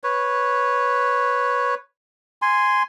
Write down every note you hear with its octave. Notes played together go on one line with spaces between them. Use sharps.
B4 C#5
G#5 C6